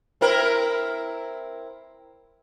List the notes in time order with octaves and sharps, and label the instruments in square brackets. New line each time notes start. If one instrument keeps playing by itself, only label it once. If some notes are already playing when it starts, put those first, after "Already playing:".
[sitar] C4 E4 A#4